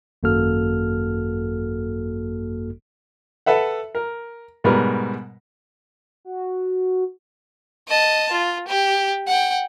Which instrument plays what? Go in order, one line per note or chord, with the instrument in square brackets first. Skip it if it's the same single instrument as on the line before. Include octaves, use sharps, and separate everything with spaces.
[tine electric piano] G#1 F#2 A#3 F#4 A4 F6
[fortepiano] A4 B4 E5 F#5
A#4
G#2 B2 G3 A#4 B4
[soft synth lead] F#4
[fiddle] D#5 A5
F4
G4
F#5 G5